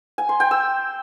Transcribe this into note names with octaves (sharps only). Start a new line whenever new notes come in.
G#5
C6
G5
E6